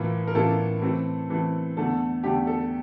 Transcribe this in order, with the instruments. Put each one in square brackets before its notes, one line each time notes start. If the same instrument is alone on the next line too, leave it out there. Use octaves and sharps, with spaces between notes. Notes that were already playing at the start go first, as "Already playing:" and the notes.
Already playing: [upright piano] A2 E3 A#3 F4
A#4
A2 E3 A#3 F4 A4
E3 A3 C4
E3 A3 C4
E2 D3 A3 A4
E2 D3 A3 G4
A4